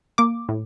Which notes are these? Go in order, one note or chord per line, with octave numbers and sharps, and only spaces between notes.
A#3 D6
A2